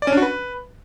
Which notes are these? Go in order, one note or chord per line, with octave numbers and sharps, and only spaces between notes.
D5
C#4
D4
F#4
B4